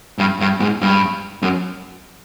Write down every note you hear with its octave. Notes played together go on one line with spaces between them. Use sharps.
G2
G2
G#2
G2
F#2